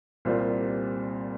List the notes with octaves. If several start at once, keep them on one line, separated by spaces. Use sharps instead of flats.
C2 A#2 G3 C4 F4